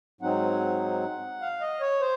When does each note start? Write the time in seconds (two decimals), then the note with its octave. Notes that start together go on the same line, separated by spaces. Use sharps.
0.21 G#2 F#3 C4 D#4 F#5
1.41 F5
1.60 D#5
1.81 C#5
2.01 C5